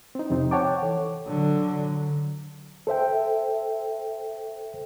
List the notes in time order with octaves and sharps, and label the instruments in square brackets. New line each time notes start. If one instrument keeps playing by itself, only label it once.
[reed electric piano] C4 D#4
F2 C3 C4 D#4
C#5 F#5 G5 A5 D6
E3 A4 C#5
[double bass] D3 F#3
[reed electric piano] A4 C5 E5 G5